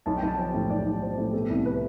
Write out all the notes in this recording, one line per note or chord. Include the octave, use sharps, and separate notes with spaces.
B1 A5
G5
B1
A5
F3
A2
B1 D5
B1
F3 C5
A2
B2 A4
C2
B4